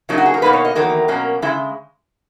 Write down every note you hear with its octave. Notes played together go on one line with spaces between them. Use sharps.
C#3 F#3 A#3 D#4 E4
F#4
G#4
A#4
B2 A#3 D#4 B4
C#5
D#5
E2 D#3 F#3 A#3 A#4
B2 F#3 A#3 C#4
C#3 G#3 E4